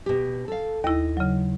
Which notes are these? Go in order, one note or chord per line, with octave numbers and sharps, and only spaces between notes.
B2 G4
A4 F5
D#2 E4 D#5
C#3 F#3